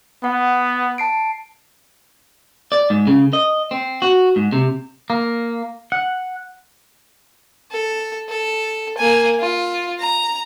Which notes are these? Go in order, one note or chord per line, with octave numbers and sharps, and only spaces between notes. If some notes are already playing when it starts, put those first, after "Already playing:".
B3 F#5
A5 C7 D7
D5
G#2
C#3
D#5
C4
F#4
G#2
C3
A#3
F#5
A4
A4
A#3 G#5
F4
A#5